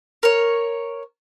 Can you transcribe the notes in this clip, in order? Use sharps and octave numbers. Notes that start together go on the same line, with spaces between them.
A#4 C#5